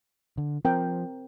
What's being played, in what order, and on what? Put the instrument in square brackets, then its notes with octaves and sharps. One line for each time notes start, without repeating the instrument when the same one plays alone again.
[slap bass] D3
[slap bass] F3 [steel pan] C4 A#4 G5